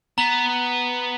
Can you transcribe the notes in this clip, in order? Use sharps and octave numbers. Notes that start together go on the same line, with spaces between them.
B3 A#5